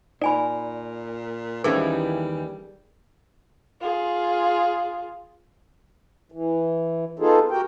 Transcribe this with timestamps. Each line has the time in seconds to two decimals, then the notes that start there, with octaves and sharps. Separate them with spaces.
0.22 A#2 D#4 D5 G#5 B5
1.64 D#2 D#3 E3 G3 C#4 G#4 A#4 G#6
3.81 F4 G#4
6.32 E3
7.19 B3 D#4 F4 G#4 A4
7.51 F#4 G4 A#4 G5